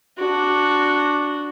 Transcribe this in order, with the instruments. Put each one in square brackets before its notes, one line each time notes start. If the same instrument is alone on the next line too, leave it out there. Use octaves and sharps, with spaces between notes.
[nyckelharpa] D4 F#4